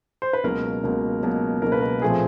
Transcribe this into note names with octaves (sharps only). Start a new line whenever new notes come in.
C5
B4
C#2 B2 F#3 A#3 A#4
C#2 B2 F#3 A#3
C#2 B2 F#3 A#3
C#2 B2 F#3 A#3 A#4
B4
A#4
A#1 A#2 F3 A3 C4 G#4